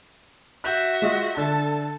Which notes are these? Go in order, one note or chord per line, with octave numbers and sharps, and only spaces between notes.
F#4 E5 F#6 G6
G#3 F4 D#5
D3 A4